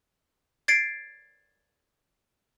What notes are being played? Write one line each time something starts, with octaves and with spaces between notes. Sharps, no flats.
G#6 A6 C7 D7